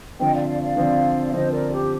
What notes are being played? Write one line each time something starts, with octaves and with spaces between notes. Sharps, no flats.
D3 F3 C4 D#5 G5
D5 F5
D5 F5
D5 F5
D3 F3 C4
D3 F3 C4 C5 D#5
A#4 D5
G4